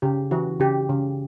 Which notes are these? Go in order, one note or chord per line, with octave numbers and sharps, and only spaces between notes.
C#3 G4
E3 F#4
C#3 G4
C#3